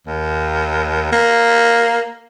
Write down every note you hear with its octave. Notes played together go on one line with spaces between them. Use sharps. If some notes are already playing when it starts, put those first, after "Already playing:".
D#2
A#3